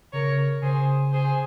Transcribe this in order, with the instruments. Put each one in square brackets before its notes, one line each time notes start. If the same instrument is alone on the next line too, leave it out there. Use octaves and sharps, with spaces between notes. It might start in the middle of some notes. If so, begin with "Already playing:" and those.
[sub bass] C#3 [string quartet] A#4 C#5
[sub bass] C#3 [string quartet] G#4 C5
[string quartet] G#4 C5